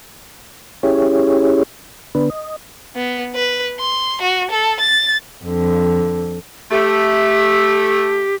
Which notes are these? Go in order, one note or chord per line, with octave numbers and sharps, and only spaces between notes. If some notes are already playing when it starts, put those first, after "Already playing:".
C#4 E4 G4 G#4 C#5
D3 B3 D4 B4
D#5
B3
B4
C6
F#4
A4
A6
F2 D3
A3 G4